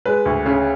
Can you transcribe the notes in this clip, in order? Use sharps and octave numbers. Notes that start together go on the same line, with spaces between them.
G#3 B4
D2
C#3